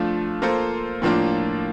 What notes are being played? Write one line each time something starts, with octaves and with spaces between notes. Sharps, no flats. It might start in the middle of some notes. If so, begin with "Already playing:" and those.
Already playing: F3 A3 D4 F4
A#3 F4 A4 C5
A2 F3 A#3 D4 F4